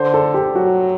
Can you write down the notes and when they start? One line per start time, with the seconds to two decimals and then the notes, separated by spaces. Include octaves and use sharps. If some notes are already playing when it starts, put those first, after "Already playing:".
Already playing: D3 C5
0.14 A4
0.34 G4
0.55 F#3 F#4